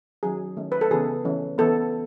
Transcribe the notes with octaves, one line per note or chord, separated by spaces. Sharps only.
D#3 F#3 C#4 G#4
D#3 A3 C#4
B4
A4
C#3 E3 B3 G#4
E3 A3 C#4
E3 B3 A4